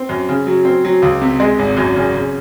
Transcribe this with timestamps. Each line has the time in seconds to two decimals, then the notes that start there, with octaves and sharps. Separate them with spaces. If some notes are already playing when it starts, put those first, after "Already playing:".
Already playing: C4
0.09 F#2
0.29 C#3
0.47 F#3
0.65 C4
0.84 F#3
1.02 C#2
1.21 C3
1.40 G#3
1.59 G#1
1.77 F#2
1.96 C#3
2.14 C#3